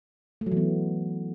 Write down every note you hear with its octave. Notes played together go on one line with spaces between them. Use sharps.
A3
F#3
E3
B3